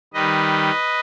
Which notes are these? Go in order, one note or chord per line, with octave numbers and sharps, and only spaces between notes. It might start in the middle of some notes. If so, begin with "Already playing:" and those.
D#3 G3 B4 D#5